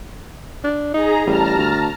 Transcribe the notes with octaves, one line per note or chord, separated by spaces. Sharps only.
D4
D#4 G#4 A#5
A1 G3 A5 A#5 F6
D2